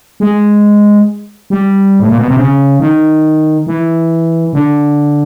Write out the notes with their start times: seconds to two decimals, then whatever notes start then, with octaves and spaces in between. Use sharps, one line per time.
0.20 G#3
1.50 G3
2.00 A2
2.09 A#2
2.18 B2
2.28 C3
2.37 C#3
2.80 D#3
3.67 E3
4.53 D3